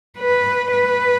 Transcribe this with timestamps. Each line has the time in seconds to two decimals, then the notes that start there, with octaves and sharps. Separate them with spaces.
0.19 B4
0.72 B4